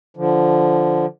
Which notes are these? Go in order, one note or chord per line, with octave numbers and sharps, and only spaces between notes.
D3 F3